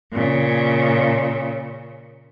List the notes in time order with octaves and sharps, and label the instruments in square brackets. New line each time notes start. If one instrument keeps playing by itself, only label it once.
[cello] A#2 C#3